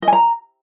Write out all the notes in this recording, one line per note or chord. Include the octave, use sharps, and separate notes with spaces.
D#5
G#5
A#5